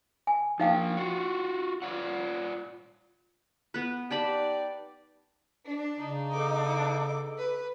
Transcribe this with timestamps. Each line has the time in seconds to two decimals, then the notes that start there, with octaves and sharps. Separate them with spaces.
0.27 G#5
0.60 F3 A#3 D#4 F5 G5
0.97 F4 F#4
1.82 F4 D5 F#5
3.74 B3 B4
4.11 D#4 G4 D5 G5 A5 B5
5.66 D4
5.99 C#3 D#4
6.33 B3 A4 D6
7.38 B4